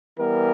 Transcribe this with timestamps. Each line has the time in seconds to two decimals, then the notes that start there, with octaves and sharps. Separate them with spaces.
0.17 E3 G3 B3 A#4